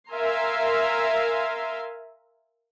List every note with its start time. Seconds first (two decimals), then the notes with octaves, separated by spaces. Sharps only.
0.10 A#4 E5 F5 G#5 A#5 C6